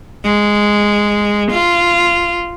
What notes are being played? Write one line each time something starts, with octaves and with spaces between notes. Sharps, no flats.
G#3
F4